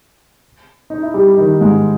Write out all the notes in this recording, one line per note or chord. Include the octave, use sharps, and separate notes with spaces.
D#4
E4
G3 G4
D#3 D#4
G#2 G#3